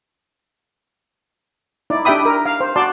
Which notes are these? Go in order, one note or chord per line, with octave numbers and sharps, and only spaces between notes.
D#4 E4 D5
D4 G4 E5 G5 B5 D#6
A#4
F5
C5
F#4 D5 A5 C6